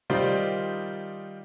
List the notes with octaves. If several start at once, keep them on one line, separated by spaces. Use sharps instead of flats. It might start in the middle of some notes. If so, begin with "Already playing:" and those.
D#3 G3 D#4 F4 C5 D5